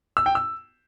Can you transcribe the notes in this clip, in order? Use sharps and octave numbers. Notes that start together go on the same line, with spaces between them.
E6
G5
E6